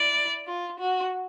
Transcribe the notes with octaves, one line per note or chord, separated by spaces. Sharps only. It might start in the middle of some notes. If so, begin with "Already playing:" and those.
Already playing: E4 D5
F4
F#4